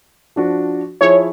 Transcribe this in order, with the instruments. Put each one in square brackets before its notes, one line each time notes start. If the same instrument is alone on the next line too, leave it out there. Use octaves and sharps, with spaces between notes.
[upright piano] F3 D4 F#4
[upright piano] F3 E4 G#4 [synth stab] C#5